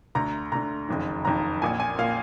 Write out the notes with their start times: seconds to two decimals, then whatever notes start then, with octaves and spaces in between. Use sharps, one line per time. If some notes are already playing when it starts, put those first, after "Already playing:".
0.15 D2 D3 A#5
0.52 D2 D3 A#5
0.89 F#1 F2 D#3
1.25 F#1 F2 D#3 A#5
1.62 A#1 A#2 G#5
1.80 G#5
1.98 A#2 F5